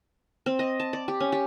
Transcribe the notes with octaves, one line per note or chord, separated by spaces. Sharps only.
C4
D#5
A5
D5
G4
C#4
G4